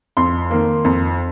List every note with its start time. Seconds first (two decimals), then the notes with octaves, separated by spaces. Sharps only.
0.17 F2 C6
0.51 D#3 A#3
0.84 F2